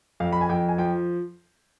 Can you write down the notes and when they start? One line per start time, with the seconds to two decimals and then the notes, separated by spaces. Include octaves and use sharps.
0.20 F2 F5
0.32 B5
0.41 G#5
0.49 F2 G5
0.69 G#5
0.78 F3 G5